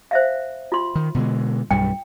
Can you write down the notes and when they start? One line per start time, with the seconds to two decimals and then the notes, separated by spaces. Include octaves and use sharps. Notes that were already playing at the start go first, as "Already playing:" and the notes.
0.11 C5 E5 F5
0.72 F4 C6
0.95 D#3
1.15 B2 D3 G#3
1.71 B1 G2 G3 G5